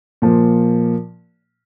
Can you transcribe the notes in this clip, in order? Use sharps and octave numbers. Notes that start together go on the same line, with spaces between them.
A#2 F3 A#3